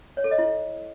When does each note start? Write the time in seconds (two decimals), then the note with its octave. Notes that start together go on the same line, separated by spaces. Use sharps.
0.17 C#5
0.24 A4
0.31 D#5
0.38 E4